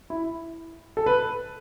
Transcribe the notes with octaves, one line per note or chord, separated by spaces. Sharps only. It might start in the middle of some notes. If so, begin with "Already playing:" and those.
E4
A4
B4